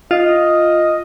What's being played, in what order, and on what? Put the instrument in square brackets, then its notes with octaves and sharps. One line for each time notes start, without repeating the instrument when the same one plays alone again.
[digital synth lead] F4 [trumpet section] D#5